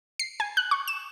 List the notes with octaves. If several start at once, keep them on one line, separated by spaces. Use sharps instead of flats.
C7
G#5
F#6
C#6
E7